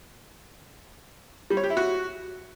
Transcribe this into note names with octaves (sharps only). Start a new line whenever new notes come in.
G3
C#5
G4
E4
F#4